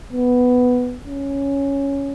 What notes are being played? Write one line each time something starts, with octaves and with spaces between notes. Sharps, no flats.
B3
C#4